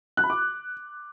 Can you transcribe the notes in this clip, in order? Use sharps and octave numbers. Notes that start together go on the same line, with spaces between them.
F#6
B5
D6